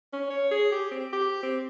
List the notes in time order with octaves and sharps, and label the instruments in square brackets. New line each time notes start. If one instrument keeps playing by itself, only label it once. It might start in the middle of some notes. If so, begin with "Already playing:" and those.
[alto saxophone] C#4
C#5
G#4
G4
C4
G4
C4